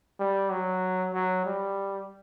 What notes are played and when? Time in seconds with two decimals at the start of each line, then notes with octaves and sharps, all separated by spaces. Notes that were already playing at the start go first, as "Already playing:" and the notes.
0.20 G3
0.51 F#3
1.13 F#3
1.45 G3